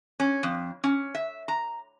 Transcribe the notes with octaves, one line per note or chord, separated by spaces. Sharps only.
C#4
F2
C#4
E5
A#5